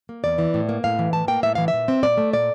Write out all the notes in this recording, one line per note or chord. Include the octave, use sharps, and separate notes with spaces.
A#3
E2 D5
E3
A2
A#3
A2 F5
E3
A2 A5
A#3 G5
A2 E5
E3 F5
E5
A#2
C4
A#2 D5
A3
A#2 D5